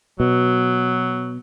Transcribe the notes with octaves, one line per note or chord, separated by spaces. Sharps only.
B2 F#3